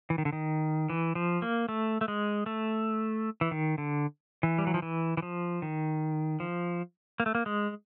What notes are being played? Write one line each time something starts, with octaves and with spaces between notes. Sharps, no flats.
E3
D#3
D3
D#3
E3
F3
A#3
A3
A3
G#3
A3
E3
D#3
D3
E3
G3
F#3
F3
E3
E3
F3
D#3
F3
A#3
A3
A#3
G#3